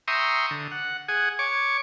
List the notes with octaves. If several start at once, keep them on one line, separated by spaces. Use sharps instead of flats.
E5 G5 A#5 C6 C#6 D#6
D3
F#5
G#4 F#5 G#5
C#5 C#6 D6